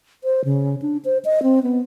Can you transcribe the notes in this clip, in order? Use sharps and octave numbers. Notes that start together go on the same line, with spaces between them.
C5
C#3
D4
C5
D#5
C4
B3